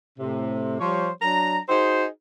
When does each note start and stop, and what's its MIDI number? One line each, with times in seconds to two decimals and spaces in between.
0.19 0.79 45
0.19 0.79 48
0.80 1.10 53
0.80 1.10 55
0.80 1.10 72
0.80 1.10 73
1.22 1.59 54
1.22 1.59 62
1.22 1.59 82
1.69 2.05 63
1.69 2.05 66
1.69 2.05 68
1.69 2.05 72